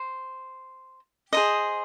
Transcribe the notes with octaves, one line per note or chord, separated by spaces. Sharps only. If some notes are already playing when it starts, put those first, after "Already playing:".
Already playing: C5
G#4 C5 D#5